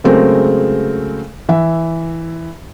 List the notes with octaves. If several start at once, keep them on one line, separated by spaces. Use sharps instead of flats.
C#3 F#3 G#3 A3 C4 A#4
E3 E5